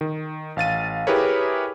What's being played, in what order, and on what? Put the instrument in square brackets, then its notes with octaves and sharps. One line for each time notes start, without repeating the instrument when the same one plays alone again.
[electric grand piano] D#3
A1 F5 A6 D#7
E4 G4 G#4 A#4 B4 C#5